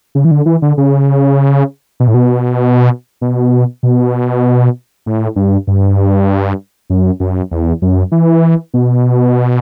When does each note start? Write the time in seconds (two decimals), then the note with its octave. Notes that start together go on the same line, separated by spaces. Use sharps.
0.15 C#3
0.25 E3
0.31 D3
0.46 E3
0.62 D3
0.77 C#3
2.00 B2
2.08 A2
2.14 B2
3.21 B2
3.83 B2
5.06 A2
5.36 G2
5.67 G2
6.90 F#2
7.20 F#2
7.51 E2
7.82 F#2
8.12 E3
8.74 B2